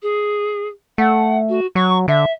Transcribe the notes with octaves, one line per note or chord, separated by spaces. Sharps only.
G#4
A3 F#5
F#4
F#3 C#6
D3 E5